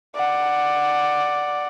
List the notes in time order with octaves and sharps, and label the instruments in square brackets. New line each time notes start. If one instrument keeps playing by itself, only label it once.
[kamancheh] D5 F#5